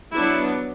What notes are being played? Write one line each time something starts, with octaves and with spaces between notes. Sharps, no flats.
F#3 B3 D4 E4